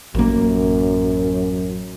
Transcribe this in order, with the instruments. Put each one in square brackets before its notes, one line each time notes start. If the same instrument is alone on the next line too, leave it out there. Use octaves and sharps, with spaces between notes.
[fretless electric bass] A1 A#3 [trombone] F#2